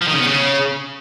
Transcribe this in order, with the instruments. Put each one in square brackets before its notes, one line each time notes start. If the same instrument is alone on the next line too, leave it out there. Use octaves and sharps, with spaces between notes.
[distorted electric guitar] F3
D#3
C#3
B3
C#3